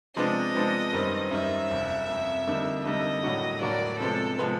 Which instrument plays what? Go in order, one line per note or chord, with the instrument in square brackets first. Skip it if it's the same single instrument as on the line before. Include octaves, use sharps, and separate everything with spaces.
[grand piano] C3 F3 G#3 B3 D4 [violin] D#5
[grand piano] C3 F3 G#3 B3 D4
F#2 D#3 G3 C4
[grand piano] F#2 D#3 G3 C4 [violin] E5
[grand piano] F#1 F2 C3
F#1 F2 C3
F2 D3 G3 A#3 D#4
[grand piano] F2 D3 G3 A#3 D#4 [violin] D#5
[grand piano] A2 F#3 A#3 D4 F#4
[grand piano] A2 F#3 A#3 D4 F#4 [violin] D5
[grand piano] C3 F3 G#3 B3 [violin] A4
[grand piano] C3 F3 G#3 B3